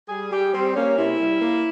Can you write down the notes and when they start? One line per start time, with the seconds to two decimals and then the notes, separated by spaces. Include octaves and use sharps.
0.09 G3 G#4
0.31 G3 G4
0.53 G3 C4
0.75 A#3 C#4
0.96 C3 E4
1.18 G3
1.41 A#3